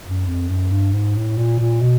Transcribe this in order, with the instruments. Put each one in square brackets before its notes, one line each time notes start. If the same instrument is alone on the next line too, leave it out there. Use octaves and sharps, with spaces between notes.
[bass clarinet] F#2
F2
F#2
G2
G#2
A2
A#2
A#2
B2